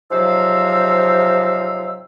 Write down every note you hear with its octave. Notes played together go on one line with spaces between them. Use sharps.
G#2 C3 F3 F#3 F5 E6